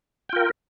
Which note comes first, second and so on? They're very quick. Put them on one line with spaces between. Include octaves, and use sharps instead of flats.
G5 F4 A#4